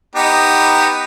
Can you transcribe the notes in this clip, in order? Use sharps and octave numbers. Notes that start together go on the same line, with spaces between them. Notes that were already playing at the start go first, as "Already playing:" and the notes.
B3 D#4 G4